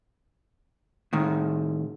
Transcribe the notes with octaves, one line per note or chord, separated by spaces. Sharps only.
A2 D#3